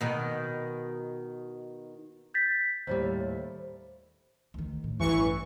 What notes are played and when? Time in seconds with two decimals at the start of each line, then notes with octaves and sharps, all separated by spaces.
0.01 B2 D#3
2.34 G6 A6 B6
2.87 D#2 A2 G3 C5
4.54 D2 D#3
4.84 A2
4.99 A1 E2 G2 E3 C#6